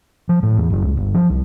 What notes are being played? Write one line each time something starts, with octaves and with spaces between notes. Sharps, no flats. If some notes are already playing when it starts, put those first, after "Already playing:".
F3
A2
E2
F#1
C#2
G1
F3
C2